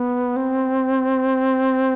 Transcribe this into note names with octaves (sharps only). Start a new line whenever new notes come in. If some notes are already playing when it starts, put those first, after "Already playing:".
Already playing: B3
C4